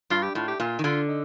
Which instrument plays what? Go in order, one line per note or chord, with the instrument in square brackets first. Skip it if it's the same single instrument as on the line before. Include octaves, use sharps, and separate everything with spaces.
[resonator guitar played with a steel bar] G2 [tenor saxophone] F4
[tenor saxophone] G4
[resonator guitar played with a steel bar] A2 [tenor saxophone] F4
[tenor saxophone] G4
[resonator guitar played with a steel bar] A#2 [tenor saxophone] F4
[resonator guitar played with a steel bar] D#3
[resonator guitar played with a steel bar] D3 [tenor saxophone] F4
[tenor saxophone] D#4